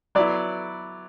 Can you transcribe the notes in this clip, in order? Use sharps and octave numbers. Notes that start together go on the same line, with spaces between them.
F#3 B3 E4 D5